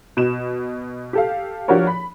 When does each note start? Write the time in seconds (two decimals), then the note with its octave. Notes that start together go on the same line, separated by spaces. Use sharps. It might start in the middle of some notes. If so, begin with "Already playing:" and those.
0.17 B2 E7
1.13 G4 A4 F5
1.68 F3 D4 F#4 G4 A#4 C#5
1.87 B5